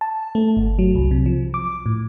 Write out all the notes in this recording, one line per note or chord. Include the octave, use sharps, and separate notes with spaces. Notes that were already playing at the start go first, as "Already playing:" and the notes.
A5
A3
G1
F#3
C2
C3
F3
D6
A2